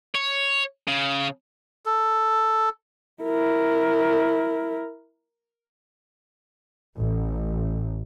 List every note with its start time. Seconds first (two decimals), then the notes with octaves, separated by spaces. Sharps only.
0.15 C#5
0.88 C#3
1.86 A4
3.23 E4 A#4
6.96 A1